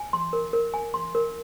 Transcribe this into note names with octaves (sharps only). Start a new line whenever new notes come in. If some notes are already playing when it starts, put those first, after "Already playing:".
Already playing: G#5
C6
A#4
A#4
G#5
C6
A#4